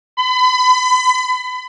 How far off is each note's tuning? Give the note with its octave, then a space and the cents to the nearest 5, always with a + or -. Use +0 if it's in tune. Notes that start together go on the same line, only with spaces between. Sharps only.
B5 +35